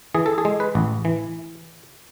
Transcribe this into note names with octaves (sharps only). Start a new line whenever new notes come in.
E3 G#4
A4
G#4
G#3
B4
A1
E3